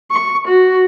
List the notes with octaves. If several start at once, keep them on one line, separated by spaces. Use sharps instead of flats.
C#6
F#4